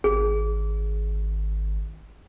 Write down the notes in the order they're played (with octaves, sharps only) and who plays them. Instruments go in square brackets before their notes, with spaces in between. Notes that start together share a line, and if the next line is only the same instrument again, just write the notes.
[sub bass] G#1 [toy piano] G#4